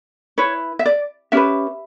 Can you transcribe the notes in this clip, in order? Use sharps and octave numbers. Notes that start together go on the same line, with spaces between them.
E4 B4 C#5
E5
D5
C#4 G4 B4 E5